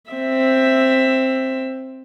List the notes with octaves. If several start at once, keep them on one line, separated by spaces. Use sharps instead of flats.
C4 E5